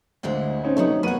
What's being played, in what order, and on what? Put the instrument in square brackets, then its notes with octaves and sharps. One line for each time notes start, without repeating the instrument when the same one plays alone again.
[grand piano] D2 D3 C5 [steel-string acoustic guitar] A#2 G#3 E4
[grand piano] C4 C#4 D#4
[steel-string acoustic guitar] C3 F#3 B3 [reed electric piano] A3 D#4 [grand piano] C#5
[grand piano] E2 A#3 D#7 [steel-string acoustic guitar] F#4 C#5 [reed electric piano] B4 F#5